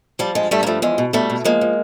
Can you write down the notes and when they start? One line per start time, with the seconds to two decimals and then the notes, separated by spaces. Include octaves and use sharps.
0.19 F3 G3
0.35 G2 G#3
0.51 G2 G3 A3
0.63 A#3
0.66 F3 G3 A3
0.82 E2 G#3
0.98 B2
1.13 B2 G3 A3
1.30 B2
1.45 F3 G#3 A#3
1.61 F3